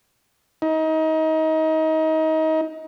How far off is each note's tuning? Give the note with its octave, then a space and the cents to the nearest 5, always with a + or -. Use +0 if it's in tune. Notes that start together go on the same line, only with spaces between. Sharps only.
D#4 +30